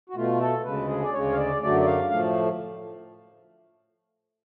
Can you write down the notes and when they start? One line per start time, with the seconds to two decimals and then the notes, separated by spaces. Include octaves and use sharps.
0.10 F#4
0.15 B2 A3 F4
0.40 A4
0.65 D2 C#3 G#3 B4
0.88 G#4
1.03 D5
1.13 D2 C#3 G#3 C#5
1.32 F5
1.37 D5
1.61 F#2 D3 F#3 A3 D5
1.80 D5
1.86 F5
2.10 A2 F3 A3 F5